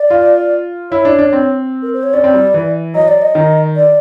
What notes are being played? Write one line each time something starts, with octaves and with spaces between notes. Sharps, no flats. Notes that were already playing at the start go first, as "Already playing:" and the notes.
Already playing: D5
F4
E4 C#5
D4
D4
C4
A#4
C5
C#5
C#4 D5
C4
G3
E3
F#3 D#5
D5
D#5
D#3
D5